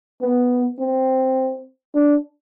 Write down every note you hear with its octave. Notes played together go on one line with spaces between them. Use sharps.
B3
C4
D4